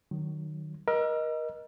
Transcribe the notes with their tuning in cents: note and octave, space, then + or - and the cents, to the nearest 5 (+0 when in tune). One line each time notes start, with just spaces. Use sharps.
D#3 -20 F#3 +0
A#4 +30 D#5 +0 E6 +45